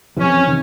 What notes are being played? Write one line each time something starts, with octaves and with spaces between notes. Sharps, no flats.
F2 C3 E3 C#4
C3 D#3